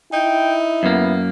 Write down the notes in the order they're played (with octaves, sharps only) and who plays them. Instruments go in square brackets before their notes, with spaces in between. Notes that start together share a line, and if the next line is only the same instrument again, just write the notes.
[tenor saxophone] D#4 [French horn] E4 [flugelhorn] G5
[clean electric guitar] F#2 A#3 [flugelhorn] B3